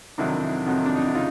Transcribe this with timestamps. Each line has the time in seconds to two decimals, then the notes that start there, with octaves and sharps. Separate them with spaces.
0.18 F2 C3 D#3 F#3 D4 E4
0.66 F2 C3 D#3 F#3
0.85 D4
0.96 D#4
1.06 E4
1.15 C#3 D#4 F4